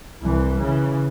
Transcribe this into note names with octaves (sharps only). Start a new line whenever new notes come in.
C2 E3
C#3 E3